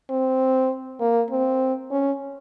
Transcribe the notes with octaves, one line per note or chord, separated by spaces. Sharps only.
C4
A#3
C4
C#4